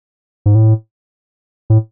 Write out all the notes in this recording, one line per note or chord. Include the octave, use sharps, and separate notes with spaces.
G#2
A2
A2